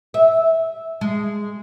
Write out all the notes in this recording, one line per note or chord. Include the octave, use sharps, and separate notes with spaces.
E5
G#3